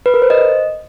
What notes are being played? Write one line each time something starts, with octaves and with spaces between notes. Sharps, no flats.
B4
A#4
C5
D#5